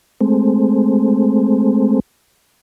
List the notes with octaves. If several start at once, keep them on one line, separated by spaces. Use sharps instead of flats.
G#3 A3 C4